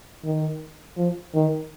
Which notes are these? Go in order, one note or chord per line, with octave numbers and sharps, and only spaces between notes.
D#3
F3
D#3